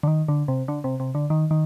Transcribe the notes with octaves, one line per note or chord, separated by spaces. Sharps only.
D3
D#3
D3
C3
D3
C3
C3
D3
D#3
D#3